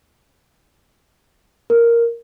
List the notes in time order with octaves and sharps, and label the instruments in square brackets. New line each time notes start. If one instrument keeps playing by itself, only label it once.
[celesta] A#4